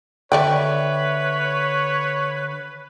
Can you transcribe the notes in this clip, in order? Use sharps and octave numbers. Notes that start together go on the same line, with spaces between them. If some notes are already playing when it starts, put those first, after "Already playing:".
D3 A3 B4 C#5 D5 E5 G5